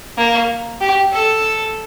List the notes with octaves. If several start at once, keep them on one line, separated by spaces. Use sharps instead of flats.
A#3
G4
A4